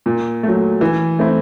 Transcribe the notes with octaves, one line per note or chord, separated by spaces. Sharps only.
A#2
F#3 A3
E3
A3 C4 E4